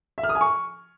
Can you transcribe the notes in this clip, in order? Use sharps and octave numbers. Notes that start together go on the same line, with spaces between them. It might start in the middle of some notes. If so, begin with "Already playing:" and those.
E5
F6
D#6
G#5
C#6